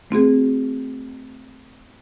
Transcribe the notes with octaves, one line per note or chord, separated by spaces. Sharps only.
A3 C4 F#4 G#4